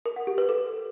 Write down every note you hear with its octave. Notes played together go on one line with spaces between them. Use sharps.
A#4
F#5
G4
B4
A4